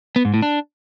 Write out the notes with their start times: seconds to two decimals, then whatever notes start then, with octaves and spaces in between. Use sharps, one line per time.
0.16 B3
0.25 G#2
0.34 A2
0.42 D4